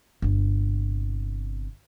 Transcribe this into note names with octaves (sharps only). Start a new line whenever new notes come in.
G1 C3